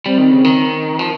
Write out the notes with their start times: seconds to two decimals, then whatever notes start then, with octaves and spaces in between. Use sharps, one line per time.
0.05 G3 C4
0.18 D#3
0.31 C#3
0.44 D#3
0.99 F3